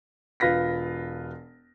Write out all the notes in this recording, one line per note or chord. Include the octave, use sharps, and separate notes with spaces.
E1 F4 B4 A#6 B6